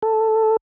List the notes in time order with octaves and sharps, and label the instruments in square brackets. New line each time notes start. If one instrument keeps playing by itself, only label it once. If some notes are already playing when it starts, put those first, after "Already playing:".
[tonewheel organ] A4